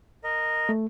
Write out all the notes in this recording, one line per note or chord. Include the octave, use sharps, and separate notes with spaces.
A#4 D#5
A3